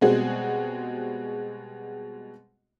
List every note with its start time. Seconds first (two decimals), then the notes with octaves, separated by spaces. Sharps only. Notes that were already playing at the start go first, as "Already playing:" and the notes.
0.01 B2 G3 G#3 C4 F#4 G#4